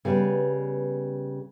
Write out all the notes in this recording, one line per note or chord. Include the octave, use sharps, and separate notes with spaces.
C#3 G3 B3 B4